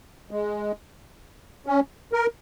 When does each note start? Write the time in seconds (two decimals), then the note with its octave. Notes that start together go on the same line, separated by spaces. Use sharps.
0.31 G#3
1.66 C#4
2.13 A#4